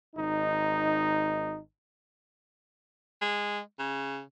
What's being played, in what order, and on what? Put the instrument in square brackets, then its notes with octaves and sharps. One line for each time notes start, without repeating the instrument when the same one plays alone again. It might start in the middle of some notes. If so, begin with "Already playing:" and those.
[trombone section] G#1 D#4
[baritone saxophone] G#3
C#3